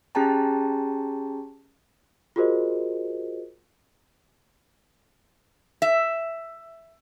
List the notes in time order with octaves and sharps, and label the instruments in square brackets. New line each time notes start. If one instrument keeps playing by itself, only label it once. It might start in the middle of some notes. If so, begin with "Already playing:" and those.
[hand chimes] C#4 G4 G#4 G5 A5 A#5
[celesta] F4 F#4 G#4 A#4 C5 D#5
[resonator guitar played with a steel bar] E5